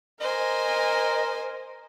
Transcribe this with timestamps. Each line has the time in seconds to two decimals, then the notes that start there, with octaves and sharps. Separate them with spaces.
0.21 A#4 C5 D#5 G#5